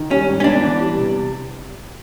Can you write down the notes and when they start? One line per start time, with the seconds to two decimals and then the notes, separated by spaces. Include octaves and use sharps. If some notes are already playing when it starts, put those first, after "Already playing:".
Already playing: D#3
0.11 G3 C#4
0.28 G#2
0.40 C#4
0.44 B3 D4
0.61 E3
0.79 G3
0.95 C3